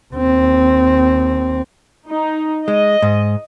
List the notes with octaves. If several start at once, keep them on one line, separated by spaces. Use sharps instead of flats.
D#2 C4
D#4
G#3 D#5
G#2